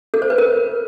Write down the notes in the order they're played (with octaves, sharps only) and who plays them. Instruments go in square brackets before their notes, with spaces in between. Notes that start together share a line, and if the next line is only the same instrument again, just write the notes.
[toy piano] A4
C5
B4
A#4